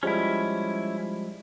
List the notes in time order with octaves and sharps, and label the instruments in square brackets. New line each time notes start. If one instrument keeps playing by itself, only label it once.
[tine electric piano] F3 G3 G#3 [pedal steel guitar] C#4 E4